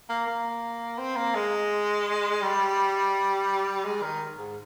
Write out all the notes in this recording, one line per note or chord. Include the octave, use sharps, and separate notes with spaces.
A#3
A#3
C4
A#3
G#3
G3
G#3
D#3
G#2